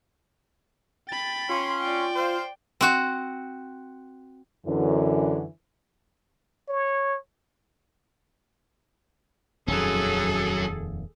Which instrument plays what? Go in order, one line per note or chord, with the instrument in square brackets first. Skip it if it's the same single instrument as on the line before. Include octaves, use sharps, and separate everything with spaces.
[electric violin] G5 B5 [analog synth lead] A6
[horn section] C#4 C6 [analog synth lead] F4
[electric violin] D5 G5
[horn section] C5 F5
[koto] C4 F#4
[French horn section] F#2 D3 E3
[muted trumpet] C#5
[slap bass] D#1 F2 D#3 [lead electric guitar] F#3 C#4 [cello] G#4 A4